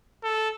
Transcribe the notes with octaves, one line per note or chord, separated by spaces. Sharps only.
A4